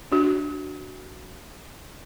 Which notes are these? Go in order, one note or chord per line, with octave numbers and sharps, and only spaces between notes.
D4 F#4